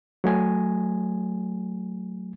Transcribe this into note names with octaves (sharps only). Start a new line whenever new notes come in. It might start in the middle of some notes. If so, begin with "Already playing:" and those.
F#3 A3 G#5